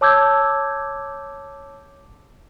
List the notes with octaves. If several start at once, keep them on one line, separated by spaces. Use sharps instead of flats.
C#5 A5 D6 E6 G6 G#6